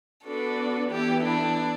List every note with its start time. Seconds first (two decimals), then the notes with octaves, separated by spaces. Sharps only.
0.25 B3 D4 F#4 A4 B4 D5
0.91 E3 B3 E4 G4 A4
1.24 D4